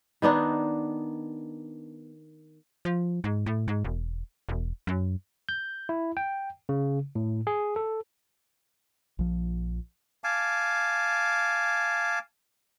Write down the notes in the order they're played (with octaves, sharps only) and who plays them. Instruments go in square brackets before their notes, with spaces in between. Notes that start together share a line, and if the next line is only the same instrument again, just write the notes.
[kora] D#3 B3 D4 D#4
[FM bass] F3
G#2
A2
G#2
E1
E1
F#2
[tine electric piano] G6
E4
G5
C#3
A2
G#4
A4
[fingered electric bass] A#1 F3
[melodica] F5 G#5 A5 D6